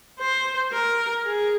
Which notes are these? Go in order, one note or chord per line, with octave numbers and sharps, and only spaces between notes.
C5
A#4
G#4